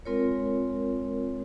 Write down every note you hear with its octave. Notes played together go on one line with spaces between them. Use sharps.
G#3 C4 F4 A#4 C#5